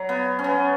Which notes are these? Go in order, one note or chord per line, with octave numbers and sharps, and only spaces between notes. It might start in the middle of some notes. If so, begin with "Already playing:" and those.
Already playing: F#3
B3
C#4
B3